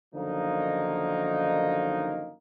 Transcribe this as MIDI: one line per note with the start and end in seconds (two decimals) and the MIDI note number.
0.15 2.32 42
0.15 2.32 50
0.15 2.32 51
0.15 2.32 53
0.15 2.32 58
0.15 2.32 63